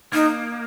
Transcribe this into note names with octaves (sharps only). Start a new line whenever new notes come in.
A#3 D#4